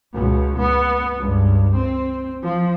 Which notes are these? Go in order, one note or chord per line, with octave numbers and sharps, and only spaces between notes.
C#2 B2
B3
C#2 G2
C4
F3